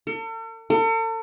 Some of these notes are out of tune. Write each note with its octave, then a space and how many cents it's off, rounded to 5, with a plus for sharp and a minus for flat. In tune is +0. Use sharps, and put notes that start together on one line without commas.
A4 +45
A4 +40